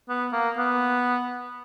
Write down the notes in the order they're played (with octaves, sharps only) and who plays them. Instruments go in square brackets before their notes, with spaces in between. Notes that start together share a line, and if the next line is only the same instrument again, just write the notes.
[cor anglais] B3
A#3
B3